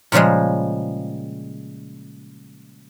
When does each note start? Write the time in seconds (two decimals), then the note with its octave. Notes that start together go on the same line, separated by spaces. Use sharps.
0.12 A#2 C#3 F3 G3 G#3